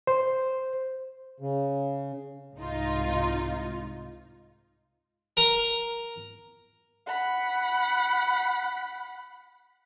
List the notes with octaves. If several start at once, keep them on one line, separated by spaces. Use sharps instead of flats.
C5
C#3
C2 G#2 D#4 F4
A#4 A#5
F#5 B5